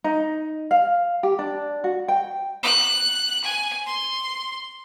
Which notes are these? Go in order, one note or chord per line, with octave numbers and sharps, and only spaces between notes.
D#4
F5
G4
D4
F#4
G5
F#6
G#5
C6